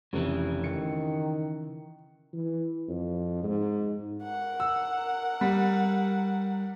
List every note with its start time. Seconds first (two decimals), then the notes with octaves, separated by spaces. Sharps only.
0.13 F1 C#3 E3
0.64 D#3 C#7
2.33 E3
2.89 F2
3.43 G#2
4.23 A#4 F#5
4.60 E6
5.41 G3